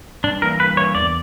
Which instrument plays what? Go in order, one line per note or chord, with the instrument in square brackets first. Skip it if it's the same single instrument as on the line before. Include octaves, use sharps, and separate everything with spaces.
[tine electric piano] G2 [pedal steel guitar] D4
[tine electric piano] E3 A#3 E4 [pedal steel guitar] A#4
[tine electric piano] G2 [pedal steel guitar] B4
[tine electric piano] E3 A#3 E4 [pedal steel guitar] C#5
[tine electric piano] E2 [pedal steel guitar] D5